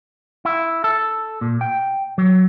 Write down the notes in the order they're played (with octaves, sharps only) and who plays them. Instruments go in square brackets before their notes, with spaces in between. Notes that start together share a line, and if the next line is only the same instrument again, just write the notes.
[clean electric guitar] E4
A4
A#2
G5
F#3